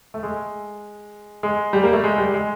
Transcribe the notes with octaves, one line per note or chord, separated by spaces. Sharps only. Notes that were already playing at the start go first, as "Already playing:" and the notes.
A3
G#3
G#3
G3
A#3
A3
G#3
G3
G#3